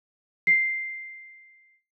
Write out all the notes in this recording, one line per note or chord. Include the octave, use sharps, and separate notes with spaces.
C7